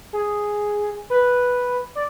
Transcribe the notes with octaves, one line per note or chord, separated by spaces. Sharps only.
G#4
B4
D5